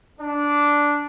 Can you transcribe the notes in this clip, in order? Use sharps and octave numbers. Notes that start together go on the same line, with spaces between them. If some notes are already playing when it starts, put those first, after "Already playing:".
D4